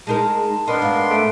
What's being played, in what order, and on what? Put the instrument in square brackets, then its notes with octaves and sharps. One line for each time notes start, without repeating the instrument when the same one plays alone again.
[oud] G#3 D#4 A#4 [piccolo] A5
[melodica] B3 D4 C6 [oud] D#4 [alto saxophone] A#4
[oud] G#2 [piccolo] F5
[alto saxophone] A3 [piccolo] D7